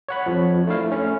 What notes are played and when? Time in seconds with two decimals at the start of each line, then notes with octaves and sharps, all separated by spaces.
0.09 C#5 F#5 B5
0.26 F2 F3
0.67 A3 D4 E4 F5
0.92 A3 C#4